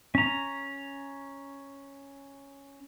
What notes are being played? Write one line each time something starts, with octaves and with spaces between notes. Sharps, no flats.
C#4 A#5